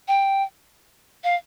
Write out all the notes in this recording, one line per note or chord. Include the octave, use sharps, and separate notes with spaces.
G5
F5